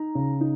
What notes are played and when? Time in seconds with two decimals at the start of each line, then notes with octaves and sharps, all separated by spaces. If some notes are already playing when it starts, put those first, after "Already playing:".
Already playing: D#4 A#5
0.15 C#3
0.41 D#4